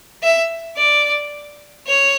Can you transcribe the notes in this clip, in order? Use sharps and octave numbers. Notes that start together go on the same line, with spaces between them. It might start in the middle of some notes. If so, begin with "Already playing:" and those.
E5
D5
C#5